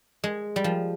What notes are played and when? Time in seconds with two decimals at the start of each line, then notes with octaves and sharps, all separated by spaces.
0.24 G#3
0.56 G3
0.64 F3